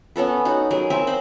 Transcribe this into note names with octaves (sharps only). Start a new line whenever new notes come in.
B3 C#4 A4 B4
D#4 F#4 B4
F#3 G#4 A#4
C4 A#4 E5 G#5
C5 B5